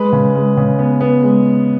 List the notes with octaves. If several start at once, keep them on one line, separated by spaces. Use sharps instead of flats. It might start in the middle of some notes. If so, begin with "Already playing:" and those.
Already playing: G#3 B4
C#3
G#3
C#3
B3
B3
G#3